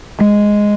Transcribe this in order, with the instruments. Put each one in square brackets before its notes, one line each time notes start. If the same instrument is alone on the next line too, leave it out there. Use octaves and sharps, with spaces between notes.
[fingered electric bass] G#3